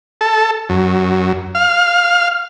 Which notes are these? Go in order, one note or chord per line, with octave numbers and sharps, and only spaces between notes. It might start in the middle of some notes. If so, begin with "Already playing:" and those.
A4
F#2
F5